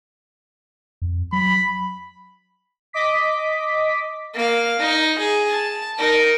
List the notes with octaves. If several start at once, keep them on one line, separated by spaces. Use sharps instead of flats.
F2
F#3 B5
D#5 D6 B6
A#3 F5
D#4
G#4
A5
D#4 A#4